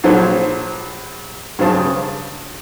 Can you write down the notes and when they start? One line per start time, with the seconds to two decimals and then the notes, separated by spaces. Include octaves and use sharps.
0.04 A#1 F3 F#3 C5
1.59 G2 C#3 F#3 C5 A5 D#6